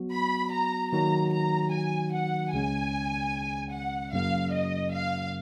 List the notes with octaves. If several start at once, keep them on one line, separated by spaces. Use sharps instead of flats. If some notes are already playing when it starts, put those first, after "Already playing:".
Already playing: F#3 B3 F#4
B5
A#5
D#3 F#3 A#3 D#4 F#4 A#5
A#5
G#5
F#5
C#2 C#3 G#3 C#4 G#5
F#5
F#2 C#3 F#3 A#3 F5
D#5
F5